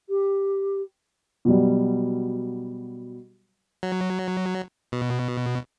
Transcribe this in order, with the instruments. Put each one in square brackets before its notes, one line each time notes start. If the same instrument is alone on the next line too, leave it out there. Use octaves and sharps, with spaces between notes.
[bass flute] G4
[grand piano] B2 F#3 G3
[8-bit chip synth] F#3
B2